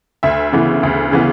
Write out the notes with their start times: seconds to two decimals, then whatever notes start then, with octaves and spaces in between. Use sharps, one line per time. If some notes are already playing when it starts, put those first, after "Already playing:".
0.23 D2 E5
0.53 C#3 E3 B3
0.83 D2
1.12 C#3 E3 B3